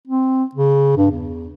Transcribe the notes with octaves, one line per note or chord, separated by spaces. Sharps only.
C4
C#3
G2
E2